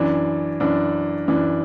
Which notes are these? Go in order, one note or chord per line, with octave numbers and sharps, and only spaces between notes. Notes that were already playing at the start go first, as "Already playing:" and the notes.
Already playing: F#2 E3 D4
F#2 E3 D4
F#2 E3 D4